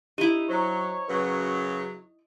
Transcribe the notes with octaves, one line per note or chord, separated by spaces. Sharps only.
D#4 E4 G4 D#7
F#3 C5 C#5 A#5
F#2 C#3 F#3 B4